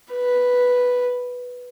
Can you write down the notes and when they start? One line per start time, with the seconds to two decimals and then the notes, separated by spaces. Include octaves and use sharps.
0.12 B4